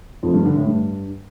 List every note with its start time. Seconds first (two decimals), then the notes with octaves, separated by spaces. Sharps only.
0.23 F2
0.34 G2
0.45 D3
0.56 A2
0.67 G2